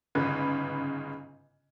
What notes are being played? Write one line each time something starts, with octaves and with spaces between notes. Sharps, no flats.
G1 G#2 C#3 B4